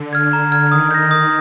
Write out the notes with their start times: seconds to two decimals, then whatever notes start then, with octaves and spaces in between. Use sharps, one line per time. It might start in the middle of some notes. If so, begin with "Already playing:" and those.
Already playing: D3
0.13 F6 G#6
0.33 A#5
0.52 F6 G#6
0.72 D#3 D#6
0.91 G6 A#6
1.10 D#3 D#6